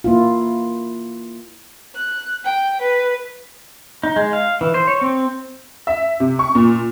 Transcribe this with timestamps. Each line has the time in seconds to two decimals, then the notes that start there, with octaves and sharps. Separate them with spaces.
0.04 A#3 E4 F4
1.96 F#6
2.44 G5
2.82 B4
4.03 D#4
4.16 G#3
4.33 F5
4.61 E3
4.74 C5
4.87 C#5
5.01 C4
5.87 E5
6.20 C3
6.39 C#6
6.55 A#2